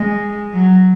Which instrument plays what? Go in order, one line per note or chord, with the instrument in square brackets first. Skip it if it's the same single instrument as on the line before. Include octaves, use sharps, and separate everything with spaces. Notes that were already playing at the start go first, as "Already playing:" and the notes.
Already playing: [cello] G#3
F#3